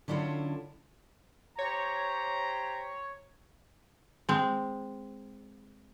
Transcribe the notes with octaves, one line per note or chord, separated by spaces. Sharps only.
D3 F#3 C#4 E4 F4 A4
G4 C5 C#5 A#5
G#3 C4